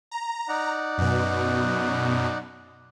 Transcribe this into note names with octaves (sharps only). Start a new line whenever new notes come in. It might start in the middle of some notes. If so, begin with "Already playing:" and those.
A#5
D#4 D5 F#5
F#2 B2